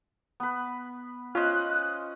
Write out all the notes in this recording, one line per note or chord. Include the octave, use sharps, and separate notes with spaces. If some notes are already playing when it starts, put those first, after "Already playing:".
B3 B4
C#4 F4 C5 D#5 F#6